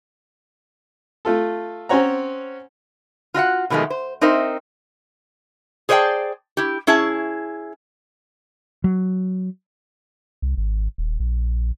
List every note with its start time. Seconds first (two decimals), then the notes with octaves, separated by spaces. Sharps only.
1.25 A3 F4 A4
1.89 C4 C#4 C5 C#5 F#5 A#5
3.34 F4 F#4 E5 F#5
3.70 B2 D#3 F3 G#3 A3
3.90 C5
4.21 C4 D#4 A#4 C5 E5
5.89 G#4 C5 D5 D#5 G5 A5
6.57 E4 G4
6.87 C#4 E4 G#4 A5
8.84 F#3
10.42 C2
10.57 G#1
10.98 D#1
11.20 A#1